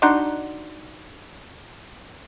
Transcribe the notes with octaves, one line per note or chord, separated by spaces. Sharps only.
D4 D#4 F#4 C6